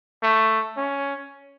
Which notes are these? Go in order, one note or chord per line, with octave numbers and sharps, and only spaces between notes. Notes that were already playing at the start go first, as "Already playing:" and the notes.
A3
C#4